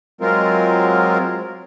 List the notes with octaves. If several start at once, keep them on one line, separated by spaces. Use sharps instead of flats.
F#3 G#3 C4 F4 A#4